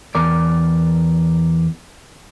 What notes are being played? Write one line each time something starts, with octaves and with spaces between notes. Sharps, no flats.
E2 A#4 D5